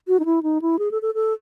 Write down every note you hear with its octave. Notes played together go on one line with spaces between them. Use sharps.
F#4
D#4
E4
D#4
E4
G#4
A4
A4
A4